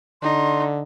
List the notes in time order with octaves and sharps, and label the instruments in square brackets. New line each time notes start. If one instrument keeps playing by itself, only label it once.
[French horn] D3 [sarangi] D#4 [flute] C6